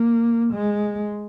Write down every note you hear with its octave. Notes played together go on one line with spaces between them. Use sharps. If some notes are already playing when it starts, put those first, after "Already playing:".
Already playing: A#3
G#3